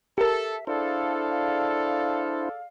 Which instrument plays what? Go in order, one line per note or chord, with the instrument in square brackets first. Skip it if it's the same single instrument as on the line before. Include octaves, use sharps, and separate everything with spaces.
[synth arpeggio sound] G4 A#4 [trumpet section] A4 [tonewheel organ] E5
[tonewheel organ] D4 E4 C5 [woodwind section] G#4 D5 F5 [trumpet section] A4